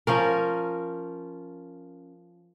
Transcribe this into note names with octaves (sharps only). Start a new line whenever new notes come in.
F3 C#4 A#4